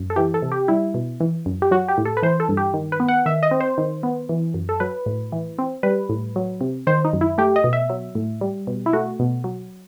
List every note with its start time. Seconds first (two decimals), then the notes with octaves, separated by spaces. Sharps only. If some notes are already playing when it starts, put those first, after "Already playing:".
Already playing: F#2
0.10 A4
0.16 E3 G4
0.34 A4
0.42 C3
0.52 G4
0.68 G3 E4
0.94 B2
1.20 E3
1.46 F#2
1.62 G4
1.71 F#3 F#4
1.89 G4
1.98 A2
2.05 A4
2.17 B4
2.23 E3 C5
2.40 A4
2.49 G2
2.57 G4
2.74 D#3
2.92 B4
3.00 B3
3.08 F#5
3.26 D#3 E5
3.43 D#5
3.51 C4
3.61 C5
3.78 D#3
4.03 B3
4.29 E3
4.54 F#2
4.69 A4
4.80 F#3 B4
5.06 A2
5.32 E3
5.58 C4
5.83 G3 B4
6.09 A2
6.36 F#3
6.61 C3
6.87 D#3 C5
7.05 D#4
7.13 F#2
7.21 E4
7.38 A3 G4
7.56 D#5
7.64 B2
7.73 E5
7.90 F#3
8.15 A2
8.41 G3
8.67 B2
8.86 E4
8.93 A3 F#4
9.20 B2
9.44 F#3